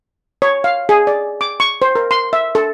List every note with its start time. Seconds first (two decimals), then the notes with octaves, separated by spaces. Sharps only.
0.42 C#5
0.64 F5
0.89 G#4
1.07 D5
1.41 D6
1.60 C#6
1.82 C5
1.95 A#4
2.11 C6
2.33 E5
2.55 A4